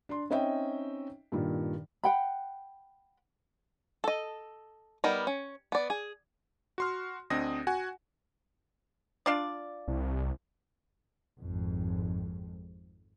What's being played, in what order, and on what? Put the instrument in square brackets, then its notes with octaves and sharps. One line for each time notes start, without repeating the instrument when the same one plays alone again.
[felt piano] D4 C6
C4 C#4 D#4 D#5 E5 G5
G2 A#2 D#3
[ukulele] F#5 G5 B5
[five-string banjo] A4 D#5
G3 B3 D#4 A#4
C#4
B3 D5
G#4
[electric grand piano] F#4 C6 F6
D2 C4 D4 D#5 D#6 A#6
F#4 F#5 G#5
[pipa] D4 F4 D5
[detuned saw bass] C2
[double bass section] G#1 F2